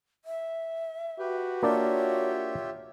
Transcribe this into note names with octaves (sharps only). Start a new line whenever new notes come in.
E5
F#4 G4 B4
A#3 D4 F4 G4 C#5 D5 E5